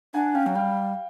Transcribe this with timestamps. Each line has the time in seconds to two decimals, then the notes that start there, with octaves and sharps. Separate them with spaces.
0.14 D4 F#5 G#5
0.34 C#4 F5 G5
0.46 F#3
0.55 G3 F5 G5